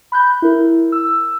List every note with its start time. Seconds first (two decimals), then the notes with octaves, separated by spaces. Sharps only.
0.12 B5 F#6 G6
0.42 E4 A#4
0.92 E6